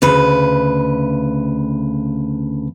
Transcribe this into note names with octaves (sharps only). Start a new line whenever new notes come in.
D2 C#3 B4